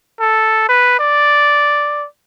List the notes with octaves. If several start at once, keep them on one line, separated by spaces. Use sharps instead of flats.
A4
B4
D5